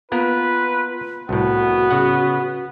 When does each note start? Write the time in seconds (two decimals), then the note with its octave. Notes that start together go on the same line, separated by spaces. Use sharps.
0.12 A#3 B3 F4 A#4 B4
1.29 C2 A2 B3 F#4
1.91 C#3 F#5